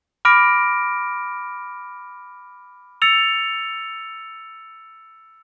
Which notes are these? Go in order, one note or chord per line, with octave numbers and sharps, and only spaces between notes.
B5 D6 F6 A#6 D7
E6 A6 C#7 F7